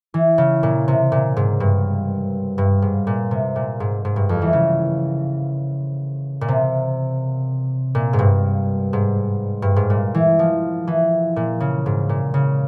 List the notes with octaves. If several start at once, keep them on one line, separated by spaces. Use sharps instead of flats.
E3
C#3
A#2
C3
A#2
G#2
G2
G2
G#2
A#2
C3
A#2
G#2
G#2
G2
F2
E3
C#3
A#2
C3
A#2
G#2
G2
G#2
G2
G#2
A#2
E3
F3
E3
A#2
C#3
G#2
A#2
C#3